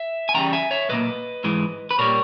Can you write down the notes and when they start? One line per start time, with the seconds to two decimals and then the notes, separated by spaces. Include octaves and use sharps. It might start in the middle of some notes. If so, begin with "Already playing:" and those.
Already playing: E5
0.29 G#5
0.34 E2 C#3 G3 G5 A#5
0.53 E5 G#5
0.71 C#5 E5
0.89 B1 A#2 A#3 B4 D#5
1.44 G#2 E3 G#3
1.91 B4
1.99 A#2 G3 A#3 A#4 C#5